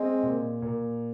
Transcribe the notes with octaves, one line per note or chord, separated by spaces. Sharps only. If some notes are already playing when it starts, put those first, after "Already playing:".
Already playing: G#3 C4
A#2
A#2